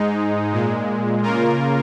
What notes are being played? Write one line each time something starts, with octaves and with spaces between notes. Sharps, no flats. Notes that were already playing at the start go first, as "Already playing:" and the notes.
Already playing: G#2 G#3 D#4
A#2 G#3
C#3 A#3 F4 A#4